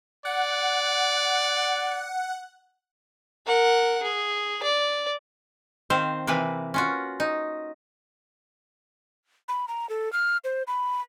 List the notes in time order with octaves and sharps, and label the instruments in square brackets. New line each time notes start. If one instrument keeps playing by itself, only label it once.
[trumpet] D5 [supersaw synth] F#5
[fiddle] A#4 F#5
G#4
D5
[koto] D#3 C4 C5 F5
C3 E3 A#3 B4
C#4 F4 F#4
D#4
[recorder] B5
A#5
A4
F6
C5
B5